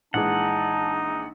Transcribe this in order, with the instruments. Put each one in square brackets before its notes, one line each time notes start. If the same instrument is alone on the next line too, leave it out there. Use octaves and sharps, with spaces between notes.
[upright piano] A#1 E3 G#3 [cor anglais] D#4 [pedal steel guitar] F#5 [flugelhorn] A5